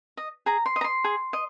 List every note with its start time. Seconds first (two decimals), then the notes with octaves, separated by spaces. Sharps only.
0.17 D#5
0.46 G#4 A#5
0.66 C6
0.76 D#5
0.81 A#5
0.84 C6
1.04 G#4
1.33 D#5